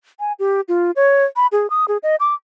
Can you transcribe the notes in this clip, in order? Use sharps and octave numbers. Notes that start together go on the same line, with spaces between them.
G#5
G4
F4
C#5
B5
G#4
D#6
G#4
D#5
D6